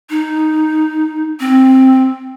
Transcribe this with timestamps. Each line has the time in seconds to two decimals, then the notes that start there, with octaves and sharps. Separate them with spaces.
0.10 D#4
1.40 C4